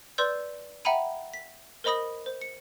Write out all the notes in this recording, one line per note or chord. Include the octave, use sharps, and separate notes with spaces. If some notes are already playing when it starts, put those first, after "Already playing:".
B4 D5 C6 E6 G6
E5 F#5 G5 A#5 B5 D#7
B6
A#4 C5 D#5 B5 D#6 A#6
C5
C#7